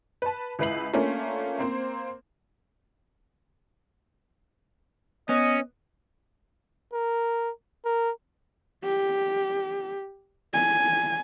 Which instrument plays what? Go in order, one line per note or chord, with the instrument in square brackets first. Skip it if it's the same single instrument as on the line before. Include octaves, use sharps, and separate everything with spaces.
[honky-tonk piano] B4 A5
C#2 E4 B4 C7 F#7
A3 A#3 C#4 D4 F4
A#3 C4 C5
[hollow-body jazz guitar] B3 [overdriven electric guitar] C#4 [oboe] D#5
[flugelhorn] A#4
A#4
[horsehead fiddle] G4
G#5